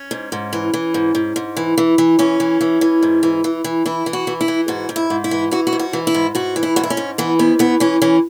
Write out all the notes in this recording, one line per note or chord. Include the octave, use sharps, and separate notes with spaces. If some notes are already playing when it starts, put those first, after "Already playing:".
Already playing: C#4
G#2
G#2
E3
E3
G#2
G#2
G#2
E3
E3
E3
E3 C#4
E3
E3
E3
G#2
E3
E3
E3
E3 E4
E3
F#4
E3
E4
E3
G#2 F#4
G#2
E4
G#2
E4
E3
E3 F#4
F#4
G#2
F#4
E3
E4
G#2
G#2 F#4
E3
E4
G#2 F#4
E4
C#4
G#2
E3 B3
G#2 B3
E3 B3
E3 C#4
E3 C#4